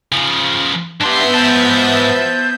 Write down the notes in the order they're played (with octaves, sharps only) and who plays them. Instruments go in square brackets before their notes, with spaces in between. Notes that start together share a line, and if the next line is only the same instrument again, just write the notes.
[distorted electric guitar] C#3 F3
[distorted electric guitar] G#2 C6 [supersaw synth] B3 E5 G6 [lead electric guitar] D4 G4
[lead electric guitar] C5 A5